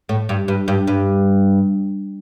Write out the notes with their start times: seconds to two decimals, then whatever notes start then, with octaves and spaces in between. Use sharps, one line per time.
0.09 A2
0.29 G2
0.48 G2
0.68 G2
0.87 G2